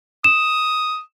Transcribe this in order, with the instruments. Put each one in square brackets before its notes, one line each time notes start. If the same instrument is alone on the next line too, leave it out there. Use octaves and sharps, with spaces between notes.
[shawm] D#6 [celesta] E7